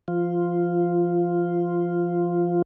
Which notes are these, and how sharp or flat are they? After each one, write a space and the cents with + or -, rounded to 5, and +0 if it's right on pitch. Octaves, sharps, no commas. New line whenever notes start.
F3 -25 F4 +0